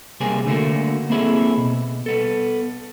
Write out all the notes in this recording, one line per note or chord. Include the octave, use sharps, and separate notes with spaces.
C2 C3 A#3 C4 G#4 G#5
D3 A3 A#3 F#4
A#3 C4 E4 G#4 A4
B2
B3 A4